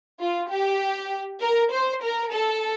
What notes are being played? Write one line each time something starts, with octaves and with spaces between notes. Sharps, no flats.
F4
G4
A#4
C5
A#4
A4